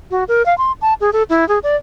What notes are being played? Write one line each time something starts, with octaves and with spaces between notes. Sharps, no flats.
F#4
A#4
F5
C6
A5
G#4
A4
E4
G#4
D5